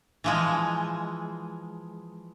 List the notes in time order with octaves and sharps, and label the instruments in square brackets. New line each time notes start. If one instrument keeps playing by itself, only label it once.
[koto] E3 F3 G#3